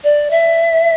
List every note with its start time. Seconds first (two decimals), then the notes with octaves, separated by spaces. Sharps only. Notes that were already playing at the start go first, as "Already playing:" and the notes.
0.04 D5
0.31 E5